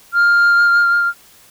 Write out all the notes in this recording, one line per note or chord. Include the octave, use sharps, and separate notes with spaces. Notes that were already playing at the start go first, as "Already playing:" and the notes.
F6